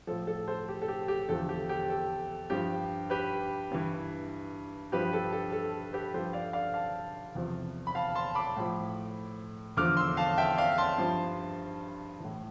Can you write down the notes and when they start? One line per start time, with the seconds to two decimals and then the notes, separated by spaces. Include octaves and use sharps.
0.07 A2 F3 A4
0.27 A4
0.48 A4 C5
0.68 G4
0.82 A4
0.88 G4
1.08 G4
1.29 E2 D3 F3 A4
1.49 G4
1.69 G4
1.89 A4
2.50 G2 F3 G4
3.10 G4 B4
3.71 G2 E3
4.92 G2 F3 G4 B4
5.13 A4
5.33 A4
5.52 A4
5.93 G4 B4
6.14 G2 F3 A4 C5
6.33 D5 F5
6.53 D5 F5
6.74 F5 A5
7.35 E2 C3 F3
7.87 B5
7.95 F5 A5
8.15 A5 C6
8.35 B5 D6
8.57 A2 F3
9.77 E2 D3 F3 D6 F6
9.97 C6 E6
10.17 F5 A5
10.38 E5 G5
10.57 D5 F5
10.78 A5 C6
10.98 G2 F3
12.20 A2 E3